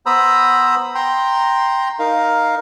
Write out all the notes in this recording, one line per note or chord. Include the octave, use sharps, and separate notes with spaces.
B3 C5 A#5 B5 D#6 E6
G5 A#5 C6
D#4 A#4 F5